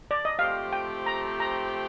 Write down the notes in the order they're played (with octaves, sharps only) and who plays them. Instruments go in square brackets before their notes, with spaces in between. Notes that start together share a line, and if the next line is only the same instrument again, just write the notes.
[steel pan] D5
D#5
[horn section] F3 A3 C4 G4 [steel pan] F5
[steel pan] G5
A#5
A#5